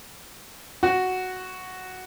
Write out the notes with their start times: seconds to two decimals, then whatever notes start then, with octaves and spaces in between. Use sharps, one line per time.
0.83 F#4